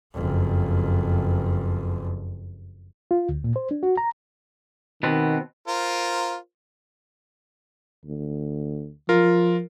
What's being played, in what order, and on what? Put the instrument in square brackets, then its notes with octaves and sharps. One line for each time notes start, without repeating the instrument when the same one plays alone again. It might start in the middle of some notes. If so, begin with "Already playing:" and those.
[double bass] F#1 F2
[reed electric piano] F4
D2
A#2
C5
D4
F#4
A#5
[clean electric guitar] B2 B3 C4 [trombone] D#3
[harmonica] F4 A#4 C5
[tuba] D2
[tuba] F3 [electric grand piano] F4 A#4